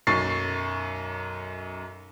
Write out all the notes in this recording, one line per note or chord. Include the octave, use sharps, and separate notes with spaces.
B1 F#2 C#6 A6 C7